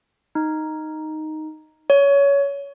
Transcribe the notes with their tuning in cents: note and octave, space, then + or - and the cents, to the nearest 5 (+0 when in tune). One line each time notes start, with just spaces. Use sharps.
D#4 +0
C#5 +20